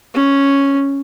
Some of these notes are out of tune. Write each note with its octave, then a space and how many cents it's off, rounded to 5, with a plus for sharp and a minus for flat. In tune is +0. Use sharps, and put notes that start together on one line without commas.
C#4 +0